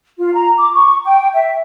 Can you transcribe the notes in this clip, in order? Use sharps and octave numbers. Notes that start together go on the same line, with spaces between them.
F4
A#5
D6
C#6
G5
E5